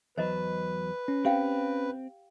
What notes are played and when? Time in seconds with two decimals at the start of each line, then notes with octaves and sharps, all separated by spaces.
0.18 E2 F#3 B4 C5 D#5
1.08 C#4
1.25 C4 G4 F5 G5